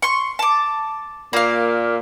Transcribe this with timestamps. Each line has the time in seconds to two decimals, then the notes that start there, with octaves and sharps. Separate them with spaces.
0.02 C6 C#6
0.39 A5 D6
1.33 A#2 A#3 F5